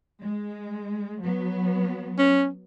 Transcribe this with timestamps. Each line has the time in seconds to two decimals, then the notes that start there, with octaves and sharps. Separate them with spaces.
0.22 G#3
1.22 F#3 B3
2.18 C#4